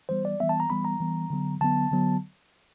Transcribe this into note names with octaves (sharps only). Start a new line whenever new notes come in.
E3 G3 B3 C5
D5
E3 G3 B3 E5
A5
A#5
E3 G3 B3 B5
A#5
E3 G3 B3
D3 F#3 B3
D3 F#3 B3 A5
D3 F#3 B3